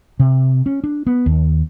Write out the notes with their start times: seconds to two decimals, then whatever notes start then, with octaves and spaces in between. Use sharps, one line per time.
0.20 C3
0.66 C#4
0.84 D4
1.07 B3
1.26 D#2